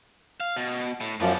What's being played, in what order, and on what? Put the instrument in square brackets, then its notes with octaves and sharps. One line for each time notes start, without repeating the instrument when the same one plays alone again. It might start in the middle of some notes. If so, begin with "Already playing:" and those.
[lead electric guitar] F5
B2
A2
[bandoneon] F#2 F3 [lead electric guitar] B3 D5